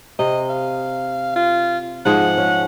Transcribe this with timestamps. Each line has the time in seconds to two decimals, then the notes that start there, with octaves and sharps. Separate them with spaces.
0.19 C3 D#5
0.49 F5
1.36 F4
2.05 G#2 F3 G#4 F#5
2.38 C#4